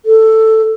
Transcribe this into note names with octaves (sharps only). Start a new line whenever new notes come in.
A4